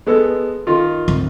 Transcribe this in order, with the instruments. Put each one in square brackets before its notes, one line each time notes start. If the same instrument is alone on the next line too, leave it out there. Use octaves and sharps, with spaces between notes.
[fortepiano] G#3 B3 A4
D#3 D#4 F4
[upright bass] G#1 D2